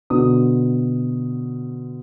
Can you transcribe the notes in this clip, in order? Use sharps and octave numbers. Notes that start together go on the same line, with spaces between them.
B2 D3 D#6